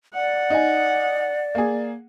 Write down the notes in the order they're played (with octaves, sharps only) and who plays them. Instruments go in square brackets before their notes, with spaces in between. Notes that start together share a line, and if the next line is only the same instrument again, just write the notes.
[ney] D5 [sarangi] F#5
[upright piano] D#4 D#5 G#5
A#3 G#4